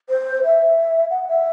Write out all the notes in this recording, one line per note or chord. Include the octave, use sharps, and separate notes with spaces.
C5
E5
F#5
E5